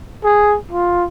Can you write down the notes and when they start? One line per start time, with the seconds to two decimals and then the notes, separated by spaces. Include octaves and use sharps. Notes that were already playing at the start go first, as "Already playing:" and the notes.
0.24 G#4
0.72 F4